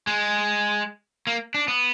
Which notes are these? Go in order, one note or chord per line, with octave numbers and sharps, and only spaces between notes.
G#3
A#3
D4
B3